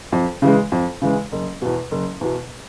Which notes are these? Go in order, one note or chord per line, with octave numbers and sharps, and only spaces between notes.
F2
C#3 E3 G#3
F2
C#3 E3 G#3
F#1
E2 B2
F#1
E2 B2